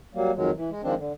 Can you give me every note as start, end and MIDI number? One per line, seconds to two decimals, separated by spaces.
0.14 0.31 54
0.14 0.31 55
0.14 0.31 58
0.35 0.51 41
0.35 0.51 51
0.35 0.51 54
0.35 0.51 56
0.55 0.70 52
0.70 0.82 56
0.83 0.94 51
0.83 0.94 53
0.83 0.94 56
0.83 0.94 60
0.83 0.94 62
0.97 1.13 50